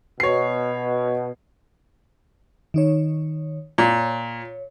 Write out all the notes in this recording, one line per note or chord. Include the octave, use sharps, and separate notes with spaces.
B2 C#5 C7
D#3 D#4 C#5
A#2 C#5